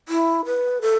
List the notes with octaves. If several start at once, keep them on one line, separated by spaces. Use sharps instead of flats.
E4
B4
A4